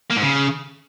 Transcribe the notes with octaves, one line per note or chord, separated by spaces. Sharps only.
A#3
G#2
C#3